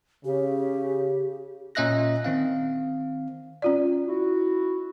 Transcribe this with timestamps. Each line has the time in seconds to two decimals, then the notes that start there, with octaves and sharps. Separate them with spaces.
0.25 C#3 G4
1.75 A#2 C#4 D#5 E5 F#6 A#6
2.24 D#3 C4 F5
3.62 C#4 F4 D5
4.07 E4 F#4